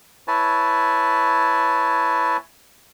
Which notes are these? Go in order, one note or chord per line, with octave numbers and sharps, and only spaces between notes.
E4 B4 C#5 G#5 A5